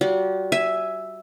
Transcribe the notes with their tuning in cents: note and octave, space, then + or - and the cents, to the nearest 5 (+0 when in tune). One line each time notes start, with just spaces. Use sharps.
G3 -35 F#4 -30
E5 +0 G#5 +0